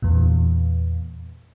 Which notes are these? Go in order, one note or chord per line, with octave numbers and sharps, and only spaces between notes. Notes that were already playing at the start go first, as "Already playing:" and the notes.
E2 A#2